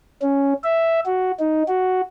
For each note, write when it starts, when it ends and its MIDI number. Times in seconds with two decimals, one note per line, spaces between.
0.22 0.53 61
0.64 1.00 76
1.06 1.32 66
1.39 1.63 63
1.68 2.01 66